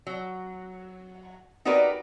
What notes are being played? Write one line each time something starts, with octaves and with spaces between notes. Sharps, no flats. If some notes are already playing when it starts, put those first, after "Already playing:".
F#3
D#4 F#4 G4 A#4 B4 D5